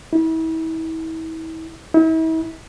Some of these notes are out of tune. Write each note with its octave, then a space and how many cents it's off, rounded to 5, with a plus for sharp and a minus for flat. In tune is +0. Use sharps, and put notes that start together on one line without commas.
E4 -35
E4 -40